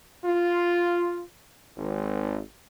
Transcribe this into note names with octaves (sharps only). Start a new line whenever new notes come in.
F4
G#1